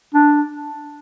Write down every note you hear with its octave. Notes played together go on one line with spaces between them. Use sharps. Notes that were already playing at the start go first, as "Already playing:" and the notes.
D4